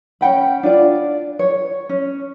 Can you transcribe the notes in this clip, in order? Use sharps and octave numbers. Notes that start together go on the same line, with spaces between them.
C#4 F#5 G5 B5
D4 F4 D5
C#5
C#4